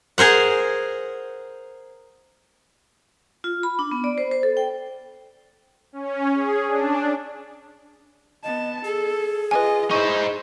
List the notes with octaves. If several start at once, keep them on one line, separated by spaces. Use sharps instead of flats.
G#4 A#4 C5 F#5
F4
B5
D4
B3
D5
C5
C5
A4
G5
C#4
G#4
D4
B3 D#5 A5
G#4 A4
F4 B4 D#5 G#5
D#4 E4 C5 B5 C#6